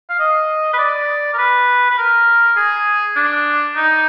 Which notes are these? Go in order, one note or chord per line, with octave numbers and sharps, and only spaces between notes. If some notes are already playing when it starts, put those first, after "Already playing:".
F5
D#5
B4
D5
A#4
B4
B4
A#4
G#4
D4
D#4